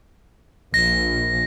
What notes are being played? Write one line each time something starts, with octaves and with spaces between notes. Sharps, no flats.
A#1 A#6